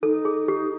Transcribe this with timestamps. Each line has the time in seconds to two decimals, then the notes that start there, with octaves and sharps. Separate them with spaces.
0.03 D#4 A4
0.25 G#4
0.48 G4